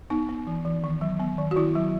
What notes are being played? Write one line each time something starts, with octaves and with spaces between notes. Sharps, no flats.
B3 D#4
B3
E3
E3
D#3
F#3
B3
D#3
F#4
D#3 E4
F#3